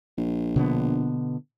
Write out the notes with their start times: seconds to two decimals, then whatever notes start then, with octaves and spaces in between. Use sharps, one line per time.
0.18 A#1
0.56 B2 D3 B3